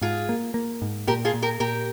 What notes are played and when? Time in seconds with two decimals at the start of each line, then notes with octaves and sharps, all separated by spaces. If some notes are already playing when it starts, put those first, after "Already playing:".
0.01 G#2 F4 G#4
0.29 A#3
0.54 A#3
0.82 G#2
1.07 A#2 G4 A#4
1.25 F4 G#4
1.34 A#2
1.42 G4 A#4
1.60 A#2 G4 A#4